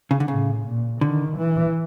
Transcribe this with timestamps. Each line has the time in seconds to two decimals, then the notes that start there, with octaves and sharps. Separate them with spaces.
0.11 C#3
0.20 D3
0.28 A2 C#3
0.65 A#2
1.01 D3 D#3
1.37 E3